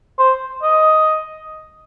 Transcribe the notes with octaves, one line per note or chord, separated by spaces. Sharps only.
C5
D#5